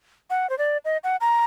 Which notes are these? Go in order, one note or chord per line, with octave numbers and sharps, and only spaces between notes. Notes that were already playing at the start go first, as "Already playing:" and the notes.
F#5
C5
D5
D#5
F#5
A#5